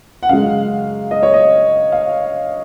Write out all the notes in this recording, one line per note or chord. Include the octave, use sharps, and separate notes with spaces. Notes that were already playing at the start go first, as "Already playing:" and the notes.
F#5
F#2 C#3 G#3 F5
D#5
C#5
D#5
F5